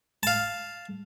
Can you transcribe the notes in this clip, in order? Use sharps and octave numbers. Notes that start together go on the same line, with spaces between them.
F5 A5